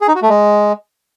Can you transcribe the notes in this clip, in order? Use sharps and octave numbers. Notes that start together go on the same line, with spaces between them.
G#4
D#4
F#4
A3
G#3